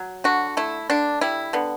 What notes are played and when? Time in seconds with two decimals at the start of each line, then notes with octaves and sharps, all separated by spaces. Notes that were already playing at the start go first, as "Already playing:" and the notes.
Already playing: F#3
0.24 D3 F#4
0.57 A3 E4
0.90 D3 D4
1.21 G3 E4
1.53 D3 B3